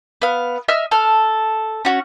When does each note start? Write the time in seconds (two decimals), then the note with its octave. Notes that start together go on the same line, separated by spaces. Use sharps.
0.22 B3 F5
0.68 D#5 E5 E6 F6
0.91 A4 F6
1.85 C#4 F#4